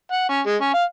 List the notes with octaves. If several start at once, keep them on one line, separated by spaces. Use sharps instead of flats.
F#5
C#4
G#3
C#4
F5